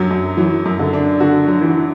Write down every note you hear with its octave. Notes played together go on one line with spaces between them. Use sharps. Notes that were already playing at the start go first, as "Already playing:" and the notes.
Already playing: F#2 F#3 D4
F#2
E3 F#3
F#2
D3
D4
D3 F#4
F#3
E3